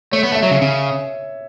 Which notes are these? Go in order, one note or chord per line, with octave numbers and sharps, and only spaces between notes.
A3 C#5
B3
A3
E5
F#3 C#5
C#3
C#3